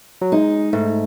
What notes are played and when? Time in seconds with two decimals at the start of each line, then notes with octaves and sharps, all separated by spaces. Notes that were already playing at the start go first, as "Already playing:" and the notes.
0.22 F#3
0.32 G#3 D#4
0.73 G#2 A3